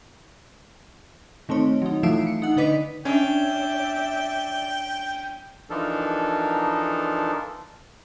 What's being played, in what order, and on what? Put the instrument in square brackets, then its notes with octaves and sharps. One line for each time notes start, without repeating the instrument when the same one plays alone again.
[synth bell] D#3 A3 C4 C#5
F#3 D#4
E3 F3 A3 E6 C7 D7
C#7
D#4 F#5
D3 D#4 B4 D#5 D6 B6
[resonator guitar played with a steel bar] C#4 D4 [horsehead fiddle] D5 E5 [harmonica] G5
[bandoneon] E3 F3 D4 D#4 A4 A#4